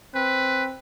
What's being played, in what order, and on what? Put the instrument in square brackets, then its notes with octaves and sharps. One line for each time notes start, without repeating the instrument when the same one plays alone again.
[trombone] C4 [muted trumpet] B4